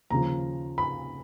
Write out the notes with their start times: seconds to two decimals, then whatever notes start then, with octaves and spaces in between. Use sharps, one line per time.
0.10 D#2 C#3 F3 A#5
0.78 B5